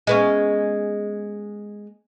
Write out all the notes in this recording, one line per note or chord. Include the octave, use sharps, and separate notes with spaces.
G#3 B3 C#4